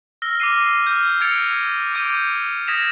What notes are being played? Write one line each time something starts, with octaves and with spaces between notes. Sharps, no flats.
E6 F6 A#6 G7
D6 F6 C7 D#7
F6 G6
E6 G#6 A6 C#7 D7 F7
D6 G6 D7 D#7
D#6 G#6 A#6 B6 E7 F7